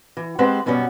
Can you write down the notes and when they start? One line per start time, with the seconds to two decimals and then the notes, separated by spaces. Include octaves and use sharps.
0.17 E3
0.39 G#3 C4 G4 B4 C5 F#5
0.66 F#2 B2 G3 B3 C#4